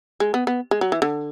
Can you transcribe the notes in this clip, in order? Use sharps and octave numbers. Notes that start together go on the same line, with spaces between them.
G#3
B3
B3
G#3
F#3
E3
D3